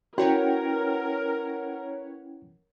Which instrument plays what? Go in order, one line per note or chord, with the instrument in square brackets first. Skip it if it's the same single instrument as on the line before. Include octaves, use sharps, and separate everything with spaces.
[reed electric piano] C#4 E4 G5 [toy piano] F#4 [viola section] A#4 [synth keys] B4 C#5 F#5